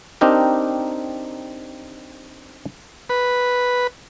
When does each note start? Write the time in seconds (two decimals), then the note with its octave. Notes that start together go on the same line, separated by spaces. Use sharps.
0.21 C4 D4 D#4 G4 A#4
3.10 B4